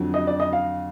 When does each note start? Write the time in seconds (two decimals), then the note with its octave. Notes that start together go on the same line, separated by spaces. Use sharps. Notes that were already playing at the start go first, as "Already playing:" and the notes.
Already playing: F2 D3 F#3
0.14 D#5
0.27 D5
0.40 D#5
0.53 F5